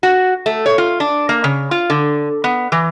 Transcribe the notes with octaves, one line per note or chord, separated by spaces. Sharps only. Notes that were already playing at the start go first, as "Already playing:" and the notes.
F#4
A3
C#5
F4
D4
A#3
C#3
F4
D3
B3
E3